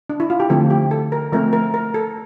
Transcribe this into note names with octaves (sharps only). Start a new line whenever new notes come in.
D4
E4
F4
G4
D3 F3 A3 C4 A4
G4
A4
A#4
F3 A3 C4 A#4
A#4
A#4
A4